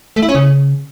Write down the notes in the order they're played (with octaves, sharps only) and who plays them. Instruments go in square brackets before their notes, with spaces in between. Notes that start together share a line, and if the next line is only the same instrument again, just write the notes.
[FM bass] A3
E4
C#4
C#3